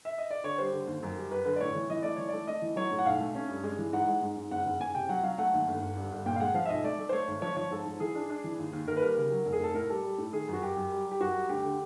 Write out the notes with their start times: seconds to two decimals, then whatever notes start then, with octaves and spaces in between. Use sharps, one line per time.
0.05 E5
0.18 D#5
0.31 D5
0.44 D3 C#5
0.58 G3 C5
0.73 D3
0.87 D#2
1.03 F#2
1.16 G3
1.31 F#2 B4
1.45 D3 B4
1.56 D5
1.61 A2 C#5
1.75 E3
1.90 E3 D#5
2.02 A3 D5
2.16 E3 C#5
2.29 A3 D5
2.47 A3 D#5
2.62 E3
2.76 F#3 C#5
2.91 A2
2.99 F#5
3.06 B1 F5
3.20 A3
3.35 C#4
3.49 G2
3.63 G#3
3.78 E3
3.93 G#2 F#5
4.08 G#3
4.22 G#2
4.37 G#2
4.51 F#1 F#5
4.66 F#1
4.80 F#1 G#5
4.95 C3 G5
5.09 F#3 F#5
5.23 F#3 F5
5.38 A3 F#5
5.53 D#2
5.68 G1
5.82 G1
5.96 G2
6.11 G1
6.26 A#2 G5
6.36 F5
6.40 G#3 F#5
6.54 F3 F5
6.65 E5
6.69 B1 D#5
6.84 A3 D5
6.99 A3
7.09 C5
7.12 A3 C#5
7.28 G#1
7.42 F3 C#5
7.56 F3 C#5
7.71 G#2 A4
7.86 G#2
8.00 E3 G#4
8.15 D4
8.30 D4
8.44 E3
8.59 D#2
8.73 D#2
8.87 D#2 A#4
8.96 B4
9.02 G3 A#4
9.17 C#3
9.32 F#3
9.46 F1
9.53 G#4
9.60 F1 A4
9.74 A2 A#4
9.89 G3 A4
10.04 G3
10.18 A2
10.33 D#3 G#4
10.48 F#2
10.53 F#4
10.62 F#2 G4
10.77 F#2
10.91 G3
11.06 G3
11.12 G4
11.20 F#2 F#4
11.35 G3
11.49 D2 G4
11.64 D3